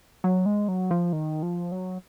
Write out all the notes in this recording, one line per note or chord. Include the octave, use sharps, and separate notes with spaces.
F#3
G#3
F#3
F3
D#3
F3
F#3